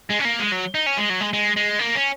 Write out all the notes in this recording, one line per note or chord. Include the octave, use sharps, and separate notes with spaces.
G#3
C#4
A#3
G#3
F#3
D#4
C#4
G#3
F#3
G#3
G#3
G#3
A#3
C#4